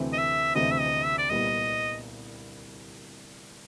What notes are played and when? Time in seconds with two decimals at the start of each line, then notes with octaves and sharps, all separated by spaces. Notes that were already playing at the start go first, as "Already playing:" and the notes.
Already playing: D2 C3 E3 A3 C4
0.12 D#5
0.18 E5
0.55 D2 C3 E3 A3 C4 D#5
0.71 E5
0.80 D#5
1.04 E5
1.18 D5
1.30 C2 A#2 G3 B3 D#5